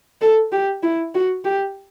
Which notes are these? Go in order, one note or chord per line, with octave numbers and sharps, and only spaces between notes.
A4
G4
E4
F#4
G4